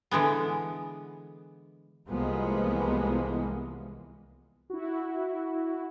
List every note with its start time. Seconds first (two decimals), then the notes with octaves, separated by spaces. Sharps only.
0.11 D3 E3 G#3 B3
2.09 C2 E3 F3 G#3 A#3 B3
4.70 E4 F#4